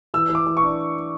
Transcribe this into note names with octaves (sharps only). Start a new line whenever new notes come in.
E3 E6
E3
D6
E3
C#6
D4